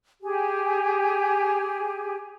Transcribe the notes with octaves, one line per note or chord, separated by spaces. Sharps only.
G4 G#4